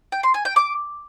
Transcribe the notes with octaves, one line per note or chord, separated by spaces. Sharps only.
G5
C6
G#5
G5
D6